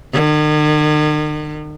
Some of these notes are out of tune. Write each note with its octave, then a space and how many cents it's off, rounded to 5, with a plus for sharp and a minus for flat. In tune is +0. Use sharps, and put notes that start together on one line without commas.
D#3 -45